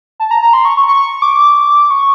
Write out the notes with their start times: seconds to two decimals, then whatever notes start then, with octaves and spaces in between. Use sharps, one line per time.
0.20 A5
0.31 A#5
0.42 A#5
0.53 C6
0.65 C#6
0.77 C#6
0.88 C#6
1.22 D6
1.90 C#6